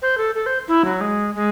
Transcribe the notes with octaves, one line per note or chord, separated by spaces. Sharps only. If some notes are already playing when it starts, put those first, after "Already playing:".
C5
A4
A4
C5
E4
F#3
G#3
G#3